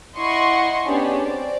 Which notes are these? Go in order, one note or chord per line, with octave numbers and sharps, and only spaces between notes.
E4 D#5 F#5 C6 C#6
B3 C#4 D4 G4 G#4
C4 D5